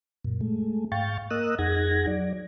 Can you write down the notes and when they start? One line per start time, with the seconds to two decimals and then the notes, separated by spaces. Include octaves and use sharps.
0.24 F#2 A#2
0.41 G#3 A3
0.92 G#2 F5 G5 C#6 A6
1.30 A#3 A#4 D#5 D#6 E6 F#6
1.59 F2 D#4 G#4 F#5 G#6 A#6
2.07 F#3 D5